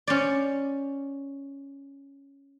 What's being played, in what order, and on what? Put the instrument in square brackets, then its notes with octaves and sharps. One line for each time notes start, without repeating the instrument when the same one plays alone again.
[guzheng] C#4 C5 D5